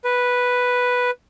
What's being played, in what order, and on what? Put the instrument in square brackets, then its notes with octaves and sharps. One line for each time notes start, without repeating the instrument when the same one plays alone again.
[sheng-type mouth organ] B4